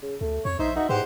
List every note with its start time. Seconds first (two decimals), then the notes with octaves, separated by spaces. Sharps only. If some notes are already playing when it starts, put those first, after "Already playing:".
0.03 C#3
0.21 D2 A3
0.45 F2 C#5
0.59 A#1 D#4 C5 E5
0.76 D#4 F#4 E5
0.89 E2 G#2 G4 C5 F#5